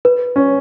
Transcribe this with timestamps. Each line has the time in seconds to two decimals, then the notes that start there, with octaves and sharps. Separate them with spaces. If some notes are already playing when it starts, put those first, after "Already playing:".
0.05 B4
0.36 C#4